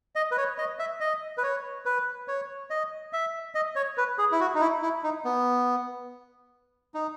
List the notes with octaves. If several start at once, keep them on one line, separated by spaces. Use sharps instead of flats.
D#5
B4
C#5
D#5
E5
D#5
B4
C#5
B4
C#5
D#5
E5
D#5
C#5
B4
G#4
E4
F#4
D#4
E4
E4
D#4
B3
D#4